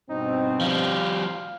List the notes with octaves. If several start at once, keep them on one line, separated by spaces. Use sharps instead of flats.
G2 B2 C4 D#4
F3 G3 F5